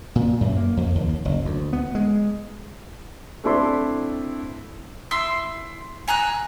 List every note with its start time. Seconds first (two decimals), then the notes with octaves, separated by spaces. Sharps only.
0.16 A#2
0.41 F#2
0.57 A#3
0.77 F2
0.95 D#2
1.25 F#1
1.45 D2
1.73 B3
1.95 G#3
3.44 A3 C4 D4 E4 C6
5.11 E4 C6 E6
6.08 G#5 A#5 E6 F#6